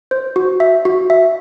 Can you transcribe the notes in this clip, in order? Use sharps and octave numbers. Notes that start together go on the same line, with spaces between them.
C5
F#4
E5
F#4
E5